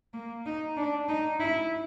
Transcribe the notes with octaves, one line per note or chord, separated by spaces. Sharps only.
A#3
D#4
D4
D#4
E4